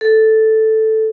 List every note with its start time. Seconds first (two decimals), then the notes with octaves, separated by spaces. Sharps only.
0.01 A4